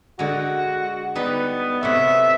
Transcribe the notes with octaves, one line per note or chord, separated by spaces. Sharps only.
D3 G#3 F#4
G3 B3 D#4 B4
C3 F#3 A3 E5